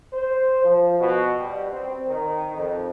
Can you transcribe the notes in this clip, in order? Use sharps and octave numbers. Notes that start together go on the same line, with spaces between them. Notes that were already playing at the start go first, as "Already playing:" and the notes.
C5
F3
B2
G3
C4
D#3
F2